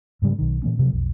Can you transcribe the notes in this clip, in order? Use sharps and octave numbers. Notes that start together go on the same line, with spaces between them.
G#2 C#3 G3
B1 D#3
A#2 E3 A#3 C#4
C3 F3 F#3
B1 F2